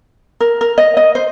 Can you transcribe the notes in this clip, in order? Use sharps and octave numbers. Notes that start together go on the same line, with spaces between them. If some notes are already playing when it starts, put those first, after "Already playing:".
A#4
A#4
D#5
D#5
C5